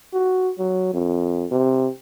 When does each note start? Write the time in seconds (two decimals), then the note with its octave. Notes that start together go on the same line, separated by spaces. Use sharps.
0.13 F#4
0.58 F#3
0.93 F2
1.51 C3